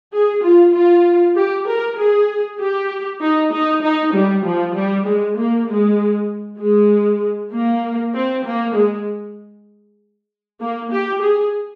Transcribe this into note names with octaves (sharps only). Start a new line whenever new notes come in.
G#4
F4
F4
G4
A#4
G#4
G4
D#4
D#4
D#4
G3
F3
G3
G#3
A#3
G#3
G#3
A#3
C4
A#3
G#3
A#3
G4
G#4